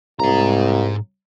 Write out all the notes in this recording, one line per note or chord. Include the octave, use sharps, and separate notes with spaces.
C2 G#2 A#5